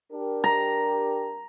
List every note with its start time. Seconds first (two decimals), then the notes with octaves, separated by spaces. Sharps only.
0.13 D4 G4 A#4
0.44 A#5